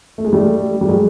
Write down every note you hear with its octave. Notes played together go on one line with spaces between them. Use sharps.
A3
G#3
G3 A3
G3
F#3 G#3